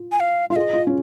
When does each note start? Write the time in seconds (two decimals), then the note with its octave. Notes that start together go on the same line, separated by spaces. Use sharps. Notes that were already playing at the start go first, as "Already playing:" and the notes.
Already playing: F4
0.12 G#5
0.20 F5
0.50 F4 F5
0.56 G#4 D#5
0.73 F4
0.87 C#4